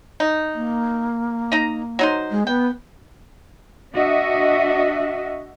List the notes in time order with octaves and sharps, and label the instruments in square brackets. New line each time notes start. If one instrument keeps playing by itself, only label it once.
[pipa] D#4
[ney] A#3
[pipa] D#4 D#5 A#5
F#3 D#4 C5
[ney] G#3
[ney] B3 [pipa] G5
[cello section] D4 F#4 D#5 E5